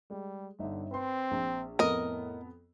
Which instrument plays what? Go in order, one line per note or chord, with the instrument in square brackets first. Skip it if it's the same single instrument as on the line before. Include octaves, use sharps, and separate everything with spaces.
[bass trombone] G3 [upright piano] G#3
[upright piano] G1 D#4 E5 [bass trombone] D3
[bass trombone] C4 [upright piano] B4 C6
[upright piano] A#1
[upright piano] F2 B3 A4 [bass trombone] A2 [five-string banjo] A#4 D#5